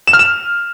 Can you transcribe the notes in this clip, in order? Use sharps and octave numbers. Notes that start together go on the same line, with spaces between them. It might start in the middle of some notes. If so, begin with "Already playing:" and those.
E7
F6
E7